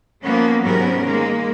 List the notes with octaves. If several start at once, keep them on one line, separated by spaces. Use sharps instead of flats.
F3 A#3 B3 C#4
G#2 C3 F#3 B3 C#4 A#4
D#3 G#3 A#3